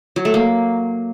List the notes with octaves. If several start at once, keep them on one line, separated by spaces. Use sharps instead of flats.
F#3
A3
A#3